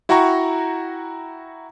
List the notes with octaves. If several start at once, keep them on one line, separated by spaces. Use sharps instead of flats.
E4 F#4 F#5 G5 A#5 C#6